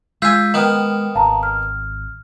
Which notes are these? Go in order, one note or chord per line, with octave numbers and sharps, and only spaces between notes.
G#3 F4 G#5 E6 G6 B6
D#3 B3 G5 F6
G#1 F5 A5 A#5
F6